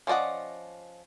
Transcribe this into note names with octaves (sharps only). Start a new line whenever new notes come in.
F3 C#4 D5 D#5 F#5